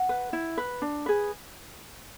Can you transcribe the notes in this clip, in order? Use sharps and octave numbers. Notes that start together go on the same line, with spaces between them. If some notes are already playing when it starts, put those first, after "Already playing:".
Already playing: F#5
B4
E4
B4
D4
G#4 B4